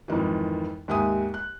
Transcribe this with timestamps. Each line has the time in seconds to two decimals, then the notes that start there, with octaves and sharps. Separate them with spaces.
0.08 F2 G#2 D#3 E3
0.88 D#2 G#2 G4 E5 G#5 D#6
1.34 F#6